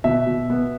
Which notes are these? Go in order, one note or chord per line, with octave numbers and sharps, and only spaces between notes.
B2 E5
B2
B3